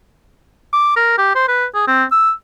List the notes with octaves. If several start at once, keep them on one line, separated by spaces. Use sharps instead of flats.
D6
A#4
G4
C5
B4
G#4
C4
E6